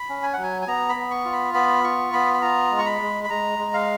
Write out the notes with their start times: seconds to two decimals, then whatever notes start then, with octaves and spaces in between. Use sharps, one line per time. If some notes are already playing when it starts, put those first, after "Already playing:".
Already playing: B5
0.09 C#4
0.23 G#5
0.33 F#5
0.38 F#3
0.43 G#5
0.62 G#5
0.67 B3 A#5
0.89 B5
0.96 B3
1.11 C#6
1.25 F4
1.32 B5
1.54 B3 B5
1.84 F4 C#6
2.13 B3 B5
2.34 B5
2.42 F4 A#5
2.71 G#3
2.79 C#6
2.86 B5
3.02 G#3
3.24 B5
3.30 G#3 A#5
3.59 G#3
3.74 F5